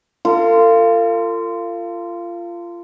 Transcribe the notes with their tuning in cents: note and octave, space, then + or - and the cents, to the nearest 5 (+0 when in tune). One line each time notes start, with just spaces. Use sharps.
F4 -20 A4 +45